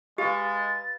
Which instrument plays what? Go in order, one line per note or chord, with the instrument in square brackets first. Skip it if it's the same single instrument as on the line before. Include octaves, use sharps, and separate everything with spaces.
[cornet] G#3 [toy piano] G4 [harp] B4 F5 [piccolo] A6